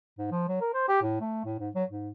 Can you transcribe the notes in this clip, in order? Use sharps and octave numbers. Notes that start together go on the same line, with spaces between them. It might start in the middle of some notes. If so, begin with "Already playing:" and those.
G#2
F3
F#3
A#4
C5
G4
A2
A3
A2
G#2
F#3
G#2